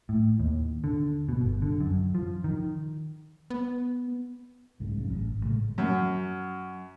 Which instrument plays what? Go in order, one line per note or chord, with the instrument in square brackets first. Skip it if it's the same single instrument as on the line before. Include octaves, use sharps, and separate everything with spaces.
[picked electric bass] A2
D#2
D3
B2
G1
D3
F#2
F3
D#3
[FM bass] B3
[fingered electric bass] C2 G#2 C#3
C2 F#2 C#3
A1
G#1
A2 C#3 G#3 A3
[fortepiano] F#2